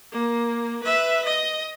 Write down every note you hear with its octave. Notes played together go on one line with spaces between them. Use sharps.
A#3
B4 E5
D#5